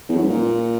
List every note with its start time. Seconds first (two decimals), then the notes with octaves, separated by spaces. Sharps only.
0.09 E2
0.16 F#2
0.23 G#2
0.30 A#2